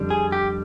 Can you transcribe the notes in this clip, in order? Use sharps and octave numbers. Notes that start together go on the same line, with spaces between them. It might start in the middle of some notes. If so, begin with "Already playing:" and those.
Already playing: F2 D3 G3
G#4
G4